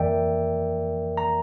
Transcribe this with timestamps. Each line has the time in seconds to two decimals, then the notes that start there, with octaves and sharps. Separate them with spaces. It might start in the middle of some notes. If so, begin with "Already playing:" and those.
Already playing: F2 E3 A#3 A#4 D5 E5 G5
1.17 A#5